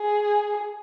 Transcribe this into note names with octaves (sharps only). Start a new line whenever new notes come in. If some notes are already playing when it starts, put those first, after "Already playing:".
Already playing: G#4